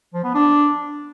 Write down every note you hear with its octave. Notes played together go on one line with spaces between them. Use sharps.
F3
B3
D4